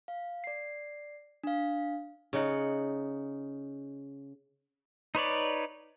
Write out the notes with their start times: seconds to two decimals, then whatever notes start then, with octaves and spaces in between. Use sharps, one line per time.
0.08 F5
0.44 D5 C7
1.44 D4 F5
2.33 C#3 D#4 F#5
5.15 D#4 B4 C#5 D5